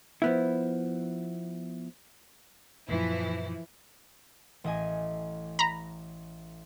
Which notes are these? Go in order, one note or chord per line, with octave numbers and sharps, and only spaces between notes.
F3 B3 E4
F#2 A#2 E3 F3 E4
A1 D#5 G#5
A#5 B5